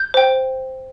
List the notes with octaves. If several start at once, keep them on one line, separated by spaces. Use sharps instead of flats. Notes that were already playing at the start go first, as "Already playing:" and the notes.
Already playing: G6
C5 G5